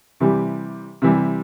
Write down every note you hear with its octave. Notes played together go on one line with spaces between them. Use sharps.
C3 E3 G3
C3 E3 G3